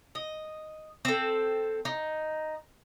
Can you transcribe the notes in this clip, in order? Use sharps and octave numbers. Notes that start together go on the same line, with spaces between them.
D#5
C4 A4
D#4